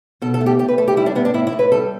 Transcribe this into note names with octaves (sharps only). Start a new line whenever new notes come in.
B2 A4
A4
A3
G4
A3 G4
B4
A3 A4
G4
G3 E4
D4
A2 B3
D4
A2 E4
E4
A2
B4
G3 A4